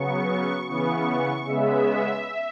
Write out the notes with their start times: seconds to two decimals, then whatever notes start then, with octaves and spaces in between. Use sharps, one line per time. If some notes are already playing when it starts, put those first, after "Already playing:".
Already playing: C#3 F#3 B3 C#6
0.67 C#3 E3 B3 C#6
1.45 C#3 G#3 B3 E5